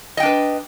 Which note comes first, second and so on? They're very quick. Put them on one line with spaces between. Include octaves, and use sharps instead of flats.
D#5 G5 D4 B4